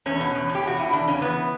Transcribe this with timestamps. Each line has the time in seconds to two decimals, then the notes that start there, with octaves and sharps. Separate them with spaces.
0.06 E2 C#4
0.20 B2
0.35 E2
0.49 B2
0.55 G4
0.64 E2 F#4
0.78 B2 E4
0.93 E2 D4
1.08 C#3 C#4
1.22 E3 B3